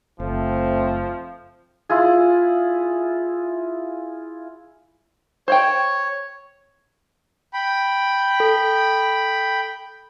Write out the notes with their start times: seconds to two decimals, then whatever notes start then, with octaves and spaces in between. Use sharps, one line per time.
0.20 F#1 F3 A3 C4
1.89 E4 F4 G#4
5.48 C5 C#5 F#5 G5
7.53 G5 B5
8.40 A4